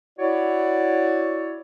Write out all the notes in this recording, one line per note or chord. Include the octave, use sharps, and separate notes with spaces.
E4 F#4 C#5 D5